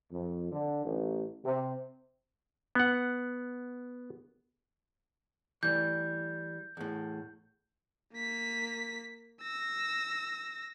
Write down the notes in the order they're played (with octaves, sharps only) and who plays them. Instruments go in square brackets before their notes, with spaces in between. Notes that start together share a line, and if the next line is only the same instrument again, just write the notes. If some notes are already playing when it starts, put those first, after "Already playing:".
[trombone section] F2
D3
A1
C3
[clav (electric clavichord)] B3 F#5
[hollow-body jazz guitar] E3 G3 A3 [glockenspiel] G6
[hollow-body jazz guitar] E2 A2
[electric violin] A#3 B6
E6 A#6